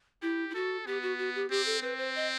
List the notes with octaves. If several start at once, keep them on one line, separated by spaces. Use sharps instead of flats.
E4 G4
E4
F#4 A4
B3 G4
F#4
F#4
G4
C4 G4
A4
C4 B4
C5
D#5